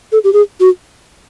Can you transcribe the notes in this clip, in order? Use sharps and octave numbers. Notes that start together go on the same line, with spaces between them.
A4
G4
G#4
F#4